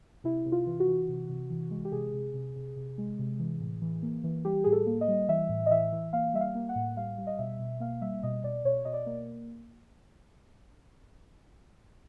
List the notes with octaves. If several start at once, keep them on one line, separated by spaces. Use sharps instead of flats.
C3 E4
C3
F4
E3
F#4
E3
C3
C3
E3
G#3
G4
C3 G#4
C3
C3
C3
C3
G#3
C3
E3
A2
E3
A#3
E3
G3 G4
A2 G#4
A4
A#3
D#5
G3
E3 E5
A2
D#5
E3 E5
E3
A#3 F5
G3 E5
F5
A#3
F#5
A2
G3 F5
G3
D#5
B2 E5
B2
A#3 F5
G3 E5
B2 D#5
B2 D5
B2 C#5
B2 D#5
D5
A#3